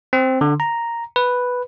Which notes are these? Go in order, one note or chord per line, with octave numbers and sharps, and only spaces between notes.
C4
D3
A#5
B4